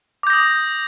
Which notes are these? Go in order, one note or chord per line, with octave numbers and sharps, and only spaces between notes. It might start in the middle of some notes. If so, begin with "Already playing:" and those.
D6 D#6 G6 A#6